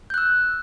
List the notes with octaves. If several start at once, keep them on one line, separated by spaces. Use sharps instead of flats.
E6 F#6 G6